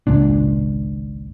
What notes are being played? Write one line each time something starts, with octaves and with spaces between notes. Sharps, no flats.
G#1 C#2 A#2 D4